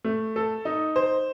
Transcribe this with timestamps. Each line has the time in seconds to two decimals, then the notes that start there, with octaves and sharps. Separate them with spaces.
0.04 A3
0.36 A4
0.65 D#4
0.96 C5